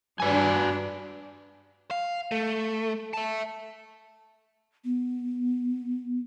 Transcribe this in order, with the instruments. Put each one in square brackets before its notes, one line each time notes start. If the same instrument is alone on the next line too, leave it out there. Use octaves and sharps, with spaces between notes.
[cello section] G2 D4 [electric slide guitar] F#4 B4 G#5
[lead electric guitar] F5
A3
E5 A5
[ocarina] B3